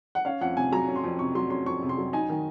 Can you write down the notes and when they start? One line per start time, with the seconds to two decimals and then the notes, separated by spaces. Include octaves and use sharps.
0.15 F#5
0.25 C#4 F5
0.41 F2 F#5
0.57 C3 G#5
0.72 F#3 A#5
0.88 C#4
0.96 C6
1.03 F2
1.19 C3 C#6
1.35 F#3 C6
1.50 C#4 C6
1.66 F2 C#6
1.82 C3
1.89 C6
1.98 F#3
2.13 D#4 G#5
2.29 D#3